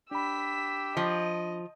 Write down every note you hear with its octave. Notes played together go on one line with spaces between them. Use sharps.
D4 G4 B5 E6 B6
F3 D#5